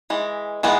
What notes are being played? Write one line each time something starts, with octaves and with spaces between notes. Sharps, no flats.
E3 G#3
E3 G#3 B3 D#4